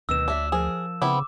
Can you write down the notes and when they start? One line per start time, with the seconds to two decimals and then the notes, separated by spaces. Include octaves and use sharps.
0.09 D2 B2 D#3 E6 E7
0.28 D4 F#4 C#5 E5
0.52 F3 G#4 A#4
1.02 C#3 B3 C4 E4 D6